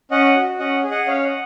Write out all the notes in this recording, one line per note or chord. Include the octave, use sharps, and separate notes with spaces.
C#4 D#5 F#5
F#4
C#4 D#5 F#5
G#4
D#5 F#5
C#4 C#5 F5
D#5 F#5